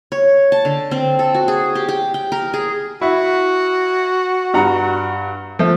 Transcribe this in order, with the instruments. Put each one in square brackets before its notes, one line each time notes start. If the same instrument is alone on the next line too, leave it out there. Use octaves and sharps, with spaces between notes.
[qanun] C#5
A5
D3
C4
A4
F#4
G#4
G4
G4
G5
A#4
G#4
[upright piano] E4 [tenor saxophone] F#4
[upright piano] G2 F#5 A#5
F3 A3